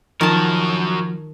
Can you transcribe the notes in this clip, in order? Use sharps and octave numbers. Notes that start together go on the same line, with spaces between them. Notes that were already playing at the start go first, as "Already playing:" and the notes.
D#3 F3 F#3 A#4 A5